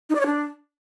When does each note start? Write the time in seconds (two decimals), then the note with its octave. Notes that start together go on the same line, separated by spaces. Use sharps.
0.10 D#4
0.15 D5
0.21 C#5
0.26 D4